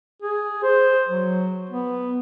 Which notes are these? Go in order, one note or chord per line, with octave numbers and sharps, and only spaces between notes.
G#4
C5
F#3
B3